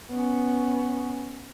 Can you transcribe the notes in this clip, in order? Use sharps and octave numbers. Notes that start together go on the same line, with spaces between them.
B3 C#4